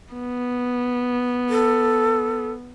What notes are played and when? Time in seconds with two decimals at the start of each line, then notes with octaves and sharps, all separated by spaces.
0.14 B3
1.49 A4